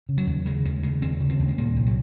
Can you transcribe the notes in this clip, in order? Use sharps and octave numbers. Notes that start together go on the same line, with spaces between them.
C#3
F#3
D#2
C#3 G#3
D#2 G#3
C#3 G#3
D#2 C4
C#3
C4
D#2
G#3
A#2 A#3
C2
F#3